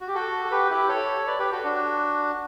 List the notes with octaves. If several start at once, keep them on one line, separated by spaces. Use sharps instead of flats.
F#4
G4
F#4 A4
A4
G4 B4
E4 G4
A4 C#5
C#5
B4 D5
G4 B4
F#4 A4
D4 F#4